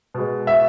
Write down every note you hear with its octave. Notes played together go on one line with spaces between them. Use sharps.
B2 G#3
E5